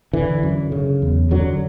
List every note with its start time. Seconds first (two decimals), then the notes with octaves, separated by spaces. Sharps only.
0.13 D3 E3
0.43 F#2
0.72 C#3
1.02 E2
1.31 F#2 D3 F#3